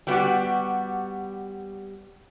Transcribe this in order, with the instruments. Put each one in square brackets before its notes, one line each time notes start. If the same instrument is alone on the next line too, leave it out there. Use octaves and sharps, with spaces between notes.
[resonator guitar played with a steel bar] G3 B3 F#4 G4